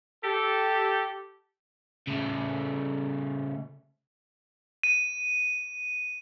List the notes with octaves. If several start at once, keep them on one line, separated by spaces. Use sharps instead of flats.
G4 A4
C#3 A3
D#7